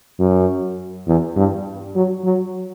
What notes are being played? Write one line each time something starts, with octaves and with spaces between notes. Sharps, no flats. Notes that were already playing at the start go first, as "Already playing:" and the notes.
F#2
E2
G2
F#3
F#3